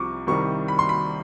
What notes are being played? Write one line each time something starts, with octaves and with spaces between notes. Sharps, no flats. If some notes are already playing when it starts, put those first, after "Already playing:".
Already playing: C2 C3 F3 C#6 D6
C2 C3 D#3 G3 C#6
B5
C6
B5